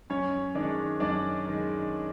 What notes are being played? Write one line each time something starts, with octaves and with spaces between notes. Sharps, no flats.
F#2 C#4 C#5
D#3 G#3 D4 D5
F#2 D4 D5
D#3 G#3